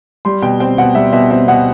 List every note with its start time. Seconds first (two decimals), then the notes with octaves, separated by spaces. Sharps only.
0.25 G3 C6
0.42 B2 G5
0.60 C4 G5
0.78 B2 F#5
0.95 G3 E5
1.13 B2 E5
1.31 C4 E5
1.48 B2 F#5